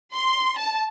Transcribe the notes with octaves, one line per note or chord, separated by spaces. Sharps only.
C6
A5